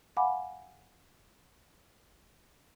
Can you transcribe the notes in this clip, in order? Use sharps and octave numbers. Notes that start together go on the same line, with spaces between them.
F5 F#5 G#5 B5 D6